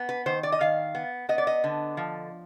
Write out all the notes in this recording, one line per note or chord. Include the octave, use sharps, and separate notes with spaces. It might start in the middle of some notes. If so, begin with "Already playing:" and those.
Already playing: B3
B4
D#3 C5
D5
D#5
D#3 F5
B3
B3 D#5
D5
D#5
D3
F3